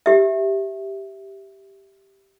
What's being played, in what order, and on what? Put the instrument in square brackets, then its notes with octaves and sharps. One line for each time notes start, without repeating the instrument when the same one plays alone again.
[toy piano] G4 E5